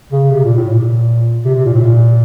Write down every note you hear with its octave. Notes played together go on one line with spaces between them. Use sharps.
C#3
C3
A#2
A2
A#2
C3
C3
A#2
A2
C3
A#2